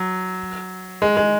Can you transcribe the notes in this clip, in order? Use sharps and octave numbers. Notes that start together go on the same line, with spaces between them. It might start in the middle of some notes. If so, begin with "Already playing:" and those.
Already playing: F#3
G#3
G#3